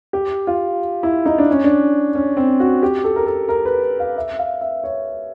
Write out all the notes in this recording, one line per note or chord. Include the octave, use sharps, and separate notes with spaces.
G4
F4
E4
D#4
D4
C#4
D4
C#4
C4
F#4
G4
A4
A#4
A4
A#4
B4
F5
E5
F5
E5
C#5